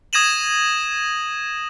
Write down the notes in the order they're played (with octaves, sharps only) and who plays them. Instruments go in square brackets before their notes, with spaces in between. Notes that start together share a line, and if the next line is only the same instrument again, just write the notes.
[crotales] D#6 G#6 A#6 D#7 E7 F#7